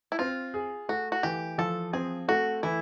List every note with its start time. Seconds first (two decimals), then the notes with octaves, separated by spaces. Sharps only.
0.12 E4
0.19 C4 F4
0.54 G#4
0.89 A3 F#4
1.12 F#4
1.23 E3 G4
1.58 F3 A4
1.93 C4 G#4
2.28 A3 F#4
2.63 E3 E4